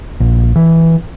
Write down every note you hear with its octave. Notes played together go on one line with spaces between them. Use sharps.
A#1
E3